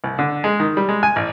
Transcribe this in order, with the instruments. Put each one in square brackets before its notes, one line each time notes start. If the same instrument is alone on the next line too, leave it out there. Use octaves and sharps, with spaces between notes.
[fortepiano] C2
D3
G#3
D#3
G3
G#3
G#5
A1